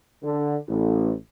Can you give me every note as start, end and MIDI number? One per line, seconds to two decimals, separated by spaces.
0.23 0.56 50
0.68 1.13 33